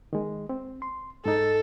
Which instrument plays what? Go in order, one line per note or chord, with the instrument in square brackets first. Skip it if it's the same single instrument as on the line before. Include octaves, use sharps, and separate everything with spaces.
[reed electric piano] D#3 G#3
C4
C6
[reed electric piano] G#2 D#4 [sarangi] A4